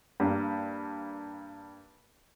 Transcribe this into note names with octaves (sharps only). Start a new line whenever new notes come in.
G2 A#3